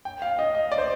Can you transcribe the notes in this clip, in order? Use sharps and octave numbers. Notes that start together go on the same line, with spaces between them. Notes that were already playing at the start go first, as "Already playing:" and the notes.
G5
F5
D#5
D#5
D5
C5